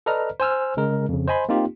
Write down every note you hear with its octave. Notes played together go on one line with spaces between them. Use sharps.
A4 B4 D5 D#5 A#5 F6
C5 G#5 E6 F6
C#3 G#3 A#4
F2 C#3
C5 D#5 G#5 B5 C6
A#3 C4 D#4 F4 G4